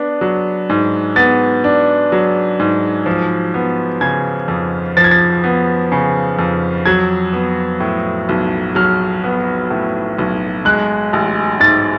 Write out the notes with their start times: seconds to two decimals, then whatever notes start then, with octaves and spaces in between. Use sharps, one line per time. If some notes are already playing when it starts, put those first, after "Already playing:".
Already playing: B3 D4
0.21 F#3
0.70 G#2
1.16 B3 A6
1.64 D4
2.12 F#3
2.60 G#2
3.06 F3
3.54 B3
4.01 C#3 G#6
4.48 F2
4.97 F3 A6
5.04 G#6
5.11 A6
5.44 B3
5.92 C#3
6.39 F2
6.86 F#3 G#6
7.33 B3
7.80 A2
8.29 B1
8.75 F#3 F6
9.24 B3
9.70 A2
10.18 B1
10.65 G#3 F#6
11.13 A1
11.60 G#2 A6